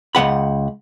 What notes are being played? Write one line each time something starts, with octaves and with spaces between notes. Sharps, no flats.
C#2 A3 F#5 B5